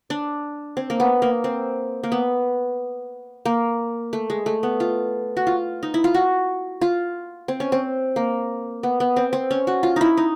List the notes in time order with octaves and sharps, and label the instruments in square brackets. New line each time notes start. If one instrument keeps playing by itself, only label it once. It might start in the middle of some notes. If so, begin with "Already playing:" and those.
[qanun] D4
C4
A#3
B3
A#3
C4
A#3
B3
A#3
A3
G#3
A3
B3
F4
F#4
F4
D#4
E4
F4
F#4
F4
C4
C#4
C4
A#3
B3
B3
C4
C4
C#4
F#4
F4
D#4 E4
D#4